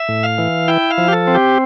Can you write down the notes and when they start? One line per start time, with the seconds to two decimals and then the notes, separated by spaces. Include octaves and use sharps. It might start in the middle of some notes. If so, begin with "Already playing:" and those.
Already playing: E5
0.09 A2
0.23 F5
0.38 E3
0.68 E4 G5
0.91 F5
0.98 F3
1.08 G4
1.13 A4
1.27 C4
1.35 G4